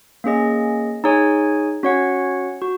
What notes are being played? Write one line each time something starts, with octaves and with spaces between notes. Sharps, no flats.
A#3 C#4 G#4 D#5
D#4 G#4 C#5 G#5
C#4 F#4 C#5 F#5
F#4